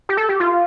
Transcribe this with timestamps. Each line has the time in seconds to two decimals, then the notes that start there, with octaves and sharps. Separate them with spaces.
0.09 G4
0.17 A4
0.29 G4
0.40 F4